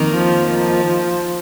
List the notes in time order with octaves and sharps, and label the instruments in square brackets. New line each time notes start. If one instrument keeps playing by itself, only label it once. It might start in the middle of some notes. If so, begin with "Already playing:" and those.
Already playing: [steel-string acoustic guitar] F2 D#3 A#3 D#4
[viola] F3
F3